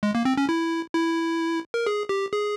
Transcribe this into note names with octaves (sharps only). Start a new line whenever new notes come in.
G#3
A#3
C4
C#4
E4
E4
A#4
G#4
G4
G#4